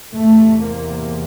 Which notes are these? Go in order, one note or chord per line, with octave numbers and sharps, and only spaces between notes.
E2 C3 A3
A#3